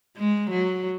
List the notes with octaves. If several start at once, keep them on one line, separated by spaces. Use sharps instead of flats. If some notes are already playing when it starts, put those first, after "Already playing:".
G#3
F#3